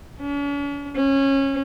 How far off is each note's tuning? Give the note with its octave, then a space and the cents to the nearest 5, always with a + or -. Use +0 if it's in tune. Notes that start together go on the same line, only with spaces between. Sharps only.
C#4 +45
C#4 -20